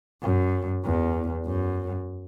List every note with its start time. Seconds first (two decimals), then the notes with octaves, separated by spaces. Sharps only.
0.23 F#2
0.85 E2
1.46 F#2